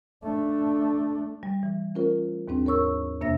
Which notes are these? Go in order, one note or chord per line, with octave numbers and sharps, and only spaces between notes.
A3 D4
G3
E3
A3 C#4 F4 A#4 C5
D#2 G#2 C4 D4
A#4 C#5 C#6 E6
F2 C3 A#3 D4 E5 A#6